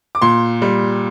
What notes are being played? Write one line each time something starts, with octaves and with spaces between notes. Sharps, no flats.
D6
A#2 C6
G3